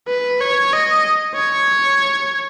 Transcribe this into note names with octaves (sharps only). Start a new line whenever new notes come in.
B4
C#5
D#5
C#5